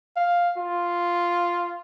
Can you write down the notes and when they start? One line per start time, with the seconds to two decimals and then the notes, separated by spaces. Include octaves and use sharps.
0.17 F5
0.57 F4